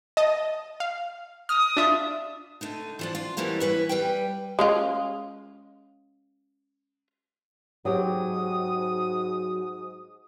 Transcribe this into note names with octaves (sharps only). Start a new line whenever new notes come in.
D#5 A5 D#6
F5
D#6 F6
D4 F4 E5
D3 A3 D#4
E3 F3 D4
F4
F#2 E3 G3 A3 A#3 C4
E3 B4 C#5
G3 B4 G5
G#3 C#4 F4
G#2 F#3 C4 G4 D#6